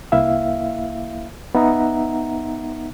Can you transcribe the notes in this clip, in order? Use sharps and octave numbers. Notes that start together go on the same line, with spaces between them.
C2 A#3 E4 E5 F5
B3 D#4 E5 F#5 A#5